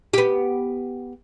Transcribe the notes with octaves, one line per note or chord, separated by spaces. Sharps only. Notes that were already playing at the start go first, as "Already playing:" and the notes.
B3 G4